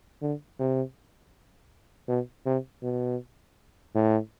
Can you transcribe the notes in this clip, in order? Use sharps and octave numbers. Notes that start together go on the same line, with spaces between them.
D3
C3
B2
C3
B2
A2